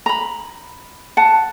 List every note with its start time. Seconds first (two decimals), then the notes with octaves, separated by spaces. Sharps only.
0.06 A#5 B5
1.17 F#5 A5